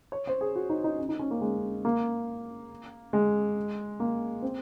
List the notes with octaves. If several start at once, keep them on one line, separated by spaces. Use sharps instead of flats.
C#5
C5
G#4
F#4
D#4
D#4
C#4
D#4
C#4
A#3
G#3
A#3
G#3
A#3
C4